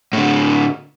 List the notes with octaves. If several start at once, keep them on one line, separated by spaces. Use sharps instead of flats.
A2 D3